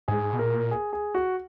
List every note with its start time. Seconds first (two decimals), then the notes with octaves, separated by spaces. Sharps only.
0.08 G#2 G#4
0.33 B2
0.39 A#2 A#4
0.71 G#4
0.93 G#4
1.15 F#4